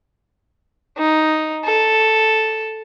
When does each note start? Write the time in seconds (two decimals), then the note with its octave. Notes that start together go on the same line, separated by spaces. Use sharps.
0.98 D#4
1.65 A4